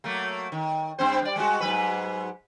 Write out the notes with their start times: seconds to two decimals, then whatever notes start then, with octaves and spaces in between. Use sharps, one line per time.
0.04 F#3 A3 A#3
0.52 D#3
0.99 G2 C4 C5
1.22 G3 D5
1.36 G3 G#3 F#4
1.60 G#2 F#3 B4